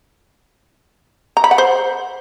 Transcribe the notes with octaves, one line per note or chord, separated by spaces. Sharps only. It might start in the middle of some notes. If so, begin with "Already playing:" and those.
A#5
B5
F#5
C5